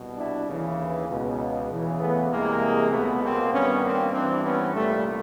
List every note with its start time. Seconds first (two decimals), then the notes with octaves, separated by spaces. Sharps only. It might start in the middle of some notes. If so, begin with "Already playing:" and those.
Already playing: C2 B2
0.16 D4 E4
0.47 D#2 C#3 E3
1.08 C#2 B2
1.69 E2 C#3 E3
1.99 A3 B3
2.29 C2 C3 E3 G#3 A#3
2.90 C#2 B2 A3 B3
3.21 A#3 C4
3.51 G2 D#3 B3 C#4
3.82 A#3 C4
4.12 G2 E3 C4 D4
4.43 B3 C#4
4.74 C2 A#2 G3 A3